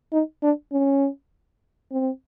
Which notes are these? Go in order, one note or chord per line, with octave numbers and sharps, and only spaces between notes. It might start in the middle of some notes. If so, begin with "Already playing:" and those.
D#4
D4
C#4
C4